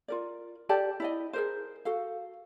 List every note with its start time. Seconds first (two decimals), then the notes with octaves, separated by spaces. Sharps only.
0.08 F4 A#4 D5
0.69 G4 A4 D5 A5
1.00 E4 D5 D#5
1.33 G#4 A#4 C5
1.85 F#4 A4 F5